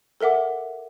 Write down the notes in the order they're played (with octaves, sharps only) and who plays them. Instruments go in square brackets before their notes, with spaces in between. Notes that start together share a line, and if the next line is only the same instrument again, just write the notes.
[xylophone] A4 A#4 E5 F#5 D6